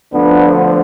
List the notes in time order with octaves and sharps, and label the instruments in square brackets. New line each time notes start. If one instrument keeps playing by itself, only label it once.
[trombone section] D2 D3 F3 B3 D4